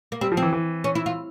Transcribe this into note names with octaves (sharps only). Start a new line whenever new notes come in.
A#3
G3 C4
F3
C4
E3
E3
C#4
E4
F4